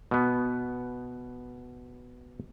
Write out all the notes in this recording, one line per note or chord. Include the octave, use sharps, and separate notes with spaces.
B2 B3